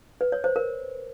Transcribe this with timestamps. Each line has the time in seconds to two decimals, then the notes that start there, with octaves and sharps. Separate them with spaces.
0.21 B4
0.32 C#5
0.44 C5
0.56 A#4